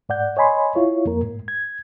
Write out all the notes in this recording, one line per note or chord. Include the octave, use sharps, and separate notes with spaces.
G#2 D5 F#5 G6
C#5 D#5 G#5 B5 C6
E4 F4 C#5
F2 A#3 A#4
G#2
G#6